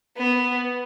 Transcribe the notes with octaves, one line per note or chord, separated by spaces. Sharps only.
B3